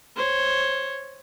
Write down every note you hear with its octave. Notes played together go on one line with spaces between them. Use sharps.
C5 C#5